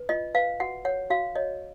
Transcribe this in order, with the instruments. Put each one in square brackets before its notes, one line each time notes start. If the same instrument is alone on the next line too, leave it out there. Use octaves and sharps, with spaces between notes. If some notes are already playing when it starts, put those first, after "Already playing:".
Already playing: [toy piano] B4
F4 D#5
B4 F5
F#4 F#5
C#5 F#5
F#4 F5
C#5 D#5